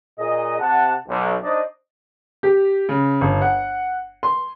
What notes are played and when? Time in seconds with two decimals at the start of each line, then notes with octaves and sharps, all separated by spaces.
0.18 A#2 G#4 D#5
0.59 C3 F#5 A5
1.08 B1
1.43 D4 D#4 C5 D5 D#5
2.43 G4
2.89 C#3
3.21 G1
3.42 F#5
4.23 C6